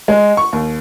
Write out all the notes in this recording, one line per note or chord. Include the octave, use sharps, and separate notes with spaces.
G#3
C#6
D#2